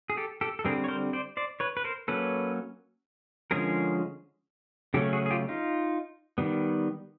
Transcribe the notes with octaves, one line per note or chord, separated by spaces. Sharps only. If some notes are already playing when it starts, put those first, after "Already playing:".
G#4
G4 A4
G4 A4
A4
D3 G3 C4 G#4 A#4
C#5
A#4 C5
C5 D5
C5 D5
B4 C#5
B4
A#4 C5
F#3 A#3 C#4 A4 B4
D3 F3 G#3 C#4 G#4 A#4
C#3 F#3 A3 C#4 G4 A4
F#4 G#4
G#4
F4 G4
D#4 F4
D#3 G3 B3